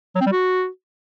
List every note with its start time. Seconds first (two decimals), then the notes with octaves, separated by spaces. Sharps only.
0.15 F#3
0.21 C4
0.26 G3
0.32 F#4